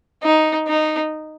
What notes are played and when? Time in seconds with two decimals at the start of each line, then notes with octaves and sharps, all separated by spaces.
0.23 D#4
0.67 D#4